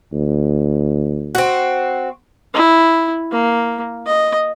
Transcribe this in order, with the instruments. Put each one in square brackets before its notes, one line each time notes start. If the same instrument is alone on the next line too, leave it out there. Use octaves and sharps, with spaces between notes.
[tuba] D2
[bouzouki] C4 F#4
[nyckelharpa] E4
A#3
D#5